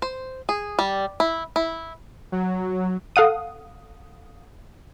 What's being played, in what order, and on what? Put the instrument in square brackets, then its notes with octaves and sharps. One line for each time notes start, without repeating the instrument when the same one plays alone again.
[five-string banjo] C5
G#4
G3
E4
E4
[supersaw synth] F#3
[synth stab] A4 F5 F#5 D#6